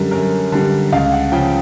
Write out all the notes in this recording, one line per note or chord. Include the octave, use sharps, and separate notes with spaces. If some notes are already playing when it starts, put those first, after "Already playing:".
Already playing: F#2 D3 G3 A#4
F#2 A#4
D3 G3
C#2 F5
F#5
C#3 F3 G5